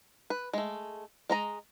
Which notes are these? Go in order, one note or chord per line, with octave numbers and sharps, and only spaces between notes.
B4
G#3 A3
G#3 D#5 A#5